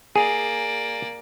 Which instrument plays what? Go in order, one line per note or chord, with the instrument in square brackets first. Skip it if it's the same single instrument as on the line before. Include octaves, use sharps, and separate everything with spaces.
[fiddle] A#3 D5 [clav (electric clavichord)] G#4